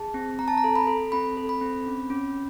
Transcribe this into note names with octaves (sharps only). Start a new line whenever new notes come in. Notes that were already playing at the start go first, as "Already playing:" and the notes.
Already playing: G#4 A5
C4
C4 A#5
A5
A#5
A4
B5
A4
C4 B5
A4
B5
C4
C#4
C#4